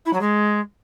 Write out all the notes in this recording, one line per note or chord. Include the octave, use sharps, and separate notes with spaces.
E4
F#3
G#3